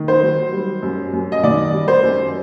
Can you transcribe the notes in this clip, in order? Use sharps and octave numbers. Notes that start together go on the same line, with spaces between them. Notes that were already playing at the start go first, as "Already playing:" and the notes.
Already playing: D#3
C5
F#3
G3
F#2
F#2
D#5
D#3 D5
G3
C5
F#2